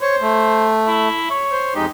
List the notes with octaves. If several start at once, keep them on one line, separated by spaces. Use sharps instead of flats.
C5 C#5
A3
E4
C#5
C5
F2 G#3 D#4 G4